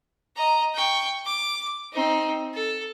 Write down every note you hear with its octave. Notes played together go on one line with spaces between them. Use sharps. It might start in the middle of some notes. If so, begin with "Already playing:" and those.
D#5 A#5
G5 C#6
D6
C4 D#4
A4